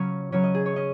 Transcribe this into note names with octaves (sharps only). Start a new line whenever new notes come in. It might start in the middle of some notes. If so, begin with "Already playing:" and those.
Already playing: C#3 F#3 C#4 C#5
C#3 F#3 C#4 C#5
D#5
G#4
C#5
C#4 D#5